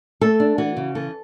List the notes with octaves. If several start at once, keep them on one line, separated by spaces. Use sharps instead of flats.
A3 A4
D4
E3 F#4
C#3
E3 A4